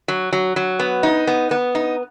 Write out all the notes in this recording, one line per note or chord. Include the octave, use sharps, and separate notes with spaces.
F#3
F#3
F#3
B3
D#4
B3
B3
D#4